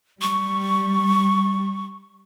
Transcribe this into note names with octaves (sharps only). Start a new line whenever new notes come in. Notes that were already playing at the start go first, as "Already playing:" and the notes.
G3 C#6